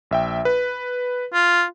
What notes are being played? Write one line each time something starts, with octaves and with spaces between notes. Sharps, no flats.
A#1 E5 G5
B4
F4